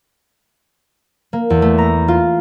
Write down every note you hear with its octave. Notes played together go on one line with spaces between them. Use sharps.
A#3
E2
A3
A#5
F4